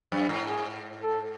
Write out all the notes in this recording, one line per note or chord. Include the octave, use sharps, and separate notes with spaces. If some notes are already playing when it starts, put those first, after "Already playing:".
F#2
G#2
G#4
A4